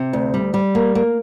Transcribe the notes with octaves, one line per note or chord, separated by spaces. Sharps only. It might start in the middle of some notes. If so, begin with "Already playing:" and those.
Already playing: C3
D2
G3
G3
A#3
A#3